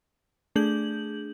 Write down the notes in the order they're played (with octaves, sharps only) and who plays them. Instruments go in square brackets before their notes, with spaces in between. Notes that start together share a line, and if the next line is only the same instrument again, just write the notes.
[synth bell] A3 D4 G#4 G6 F#7